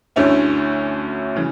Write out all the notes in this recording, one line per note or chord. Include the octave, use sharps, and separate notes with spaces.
D2 D3 A3 C#4 E4
C#3 E3